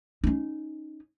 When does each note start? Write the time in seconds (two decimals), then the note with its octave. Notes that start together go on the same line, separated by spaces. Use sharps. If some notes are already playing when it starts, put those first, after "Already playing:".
0.24 C#4 D#4